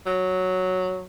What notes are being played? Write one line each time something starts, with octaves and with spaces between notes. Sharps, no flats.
F#3